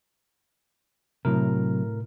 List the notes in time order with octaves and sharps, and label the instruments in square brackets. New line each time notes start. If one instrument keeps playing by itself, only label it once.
[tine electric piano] A2 A#4 [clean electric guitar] C3 F#3